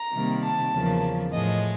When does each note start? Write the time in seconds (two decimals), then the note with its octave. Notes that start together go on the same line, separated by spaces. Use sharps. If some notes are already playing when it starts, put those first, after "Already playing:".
Already playing: A#5
0.14 C3 D#3 G3 A#3
0.43 A5
0.73 E2 C#3 F3 A#3
1.32 A2 F3 G#3 D#5